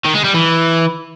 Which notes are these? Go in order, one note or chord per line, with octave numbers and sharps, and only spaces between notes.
D#3
G#3
G3
E3